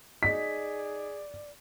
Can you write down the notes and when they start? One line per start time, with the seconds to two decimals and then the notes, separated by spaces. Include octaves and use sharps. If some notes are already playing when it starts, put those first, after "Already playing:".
0.23 D#4 G#4 D5 B6